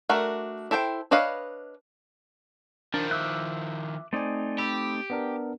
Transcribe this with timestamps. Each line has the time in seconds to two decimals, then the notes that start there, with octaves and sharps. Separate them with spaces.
0.09 A3 D4 F#4 A#4
0.71 E4 A4 C5 G5
1.11 D4 B4 C#5 D#5 F5
2.94 D#3 F3 D4 A#4
3.11 E5 D6 E6 F#6
4.13 A3 C4 D#4 C5 D5 G#5
4.58 G4 B5 E6
5.10 B3 D4 A#4